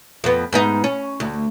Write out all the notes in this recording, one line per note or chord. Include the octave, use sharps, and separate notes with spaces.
F2 B3
G#2 B3 D#4
C#4
D2